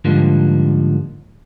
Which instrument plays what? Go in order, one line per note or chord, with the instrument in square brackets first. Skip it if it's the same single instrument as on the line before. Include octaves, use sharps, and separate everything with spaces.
[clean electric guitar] G#2 D3 F3 G3 A#3